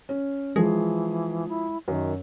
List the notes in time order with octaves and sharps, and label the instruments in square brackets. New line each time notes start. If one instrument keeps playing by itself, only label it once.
[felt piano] C#4
[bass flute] E3 [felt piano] F3 G#4 [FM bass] G#3
[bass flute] E4
[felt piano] F#2 [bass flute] D#3